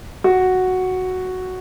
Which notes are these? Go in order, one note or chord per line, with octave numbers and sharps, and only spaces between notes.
F#4